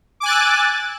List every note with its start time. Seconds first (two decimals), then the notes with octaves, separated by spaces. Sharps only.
0.20 D6
0.23 G#5
0.25 F#6
0.28 A6
0.31 E6